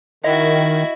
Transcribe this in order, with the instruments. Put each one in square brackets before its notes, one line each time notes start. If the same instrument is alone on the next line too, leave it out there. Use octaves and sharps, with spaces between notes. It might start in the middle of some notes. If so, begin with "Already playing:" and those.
[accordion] D#3 [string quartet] E4 F#4 [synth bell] D#5